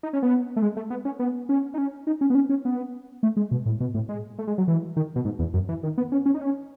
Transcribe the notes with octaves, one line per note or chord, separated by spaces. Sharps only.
D#4
C#4
B3
A3
G#3
A3
B3
C#4
B3
C#4
D#4
C#4
D#4
C#4
B3
C#4
C#4
B3
A3
G#3
B2
A2
B2
A2
G#3
A3
G#3
F#3
E3
D#3
B2
G#2
E2
F#2
E3
D#3
B3
C#4
C#4
D#4
C#4